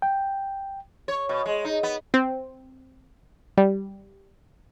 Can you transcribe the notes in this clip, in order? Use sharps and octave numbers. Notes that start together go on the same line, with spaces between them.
G5
C#5
B2
G#3
D#4
B3
C4
G3